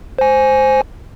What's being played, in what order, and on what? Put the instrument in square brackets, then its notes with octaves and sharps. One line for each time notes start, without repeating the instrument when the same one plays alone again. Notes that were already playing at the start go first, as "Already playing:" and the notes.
[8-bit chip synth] C5 G#5